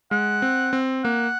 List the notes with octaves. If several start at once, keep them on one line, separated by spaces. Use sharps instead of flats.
G#3 F#5
C4
C4
A#3 F#5